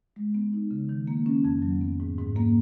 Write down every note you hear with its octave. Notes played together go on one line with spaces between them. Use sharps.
G#3
B3
D#4
C#3
D#3
A#3
C#4
F2
F#3
B3
G#2
G#2
A#3